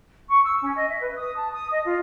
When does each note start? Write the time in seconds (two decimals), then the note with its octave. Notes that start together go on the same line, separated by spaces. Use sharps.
0.30 C#6
0.44 E6
0.61 C#4
0.76 D#5
0.89 E5
1.00 B4
1.16 D#6
1.36 A5
1.53 D#6
1.71 D#5
1.84 F4